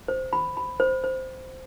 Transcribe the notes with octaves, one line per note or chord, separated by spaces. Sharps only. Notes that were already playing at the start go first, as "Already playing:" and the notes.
C5
B5
B5
C5
C5